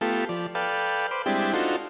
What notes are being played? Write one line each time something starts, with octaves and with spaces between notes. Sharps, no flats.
A3 B3 F4 G4 A4
F3 D5
A4 B4 D5 F5 G5
B4 C5 D6
G3 G#3 C4 D4 E4 G4
D4 D#4 F4 F#4 A4 C5